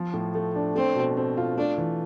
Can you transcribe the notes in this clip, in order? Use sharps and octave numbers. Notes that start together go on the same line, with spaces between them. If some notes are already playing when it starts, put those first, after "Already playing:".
Already playing: F3
A2
A3
D4
A3 C4
B2
C4
F4
A3 D4
E3